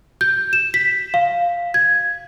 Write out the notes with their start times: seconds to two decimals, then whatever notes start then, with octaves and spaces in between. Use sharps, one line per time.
0.21 G6
0.53 E7
0.74 B6
1.14 F5
1.74 G#6